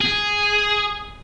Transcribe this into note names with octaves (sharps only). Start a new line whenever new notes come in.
G#4